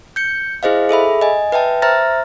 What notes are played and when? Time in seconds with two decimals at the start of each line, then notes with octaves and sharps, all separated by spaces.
0.16 G6 C#7
0.63 E4 G#4 C5 D#5 F5
0.89 G#4 A4 E5 B5
1.21 D#5 G#5
1.52 B4 E5 G5 A5
1.82 C5 E5 A#5 F6 A6 A#6